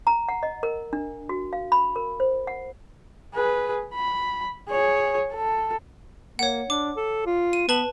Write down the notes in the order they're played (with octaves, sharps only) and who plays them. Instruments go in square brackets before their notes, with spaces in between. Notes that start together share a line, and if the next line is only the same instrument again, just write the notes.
[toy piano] A#5
F#5
D#5
A#4
D4
F#4
F5
B5
A#4
C5
F#5
[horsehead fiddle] G#4 B4
B5
G#4 C#5
A4
[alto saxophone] A#3 [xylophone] C#5 F#5
[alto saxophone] D4 [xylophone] D6
[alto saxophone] A4
F4
[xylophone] D#7
[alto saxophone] B3 [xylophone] B4 A5 F#7